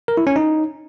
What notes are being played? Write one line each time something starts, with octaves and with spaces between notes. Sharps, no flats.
A#4
E4
C#4
D#4